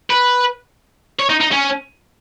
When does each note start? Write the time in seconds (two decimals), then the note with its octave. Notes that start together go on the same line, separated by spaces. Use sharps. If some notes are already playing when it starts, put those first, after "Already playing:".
0.10 B4
1.20 C#5
1.30 D#4
1.41 D#4
1.52 C#4